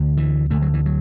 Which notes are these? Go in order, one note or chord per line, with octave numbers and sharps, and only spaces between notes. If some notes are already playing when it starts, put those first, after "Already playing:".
Already playing: D2 D3
E3
D2 D3 A3
F#3
E3
F#3